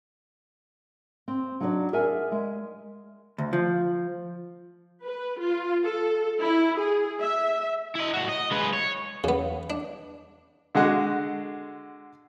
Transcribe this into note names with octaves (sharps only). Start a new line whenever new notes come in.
C4
F#3 D4 D#4 F#4 C#5 D5
G#4 A#4 D5 E5 F#5 G#5
G#3 A#4 E5
D2
F3
B4
F4
A4
E4
G#4
E5
E4 D#5
A2 F#4
D#5
G#3 B4
C#5
E2 C#3 B3
D4
D3 G#3 F#4 F#5